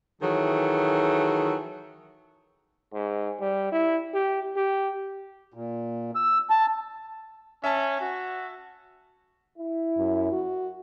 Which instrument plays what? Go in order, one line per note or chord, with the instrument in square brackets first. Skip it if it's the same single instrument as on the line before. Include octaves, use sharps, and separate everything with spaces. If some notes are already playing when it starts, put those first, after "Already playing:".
[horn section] D#3 E3 F#3 G#4 A4
[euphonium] G#2
G3
E4
G4
G4
[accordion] A#2
E6
A5
[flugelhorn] C#4 [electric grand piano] E5 A5
[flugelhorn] F#4
[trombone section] E4
[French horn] F#2
F#4